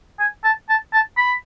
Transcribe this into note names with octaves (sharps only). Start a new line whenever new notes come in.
G#5
A5
A5
A5
B5